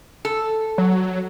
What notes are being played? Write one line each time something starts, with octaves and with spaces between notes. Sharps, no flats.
A4
F#3